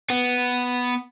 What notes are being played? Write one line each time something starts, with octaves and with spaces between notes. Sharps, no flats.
B3